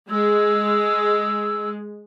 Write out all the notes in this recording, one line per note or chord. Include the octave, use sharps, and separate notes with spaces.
G#3 E6